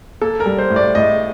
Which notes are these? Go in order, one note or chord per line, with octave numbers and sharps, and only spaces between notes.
A#3 A4
A#4
G3
C5
A2
D5
A2 D#5